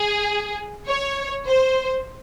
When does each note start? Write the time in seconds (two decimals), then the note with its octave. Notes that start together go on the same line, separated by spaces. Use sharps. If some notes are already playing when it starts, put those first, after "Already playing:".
Already playing: G#4
0.87 C#5
1.46 C5